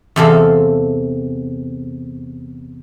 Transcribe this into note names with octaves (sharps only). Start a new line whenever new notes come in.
E2 C3 A4 F5